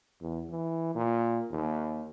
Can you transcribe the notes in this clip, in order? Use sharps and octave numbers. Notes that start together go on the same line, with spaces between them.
E2
E3
A#2
D#2